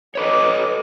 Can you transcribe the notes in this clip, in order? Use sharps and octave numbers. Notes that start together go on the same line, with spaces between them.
A4 B4 C#5 D#5 D6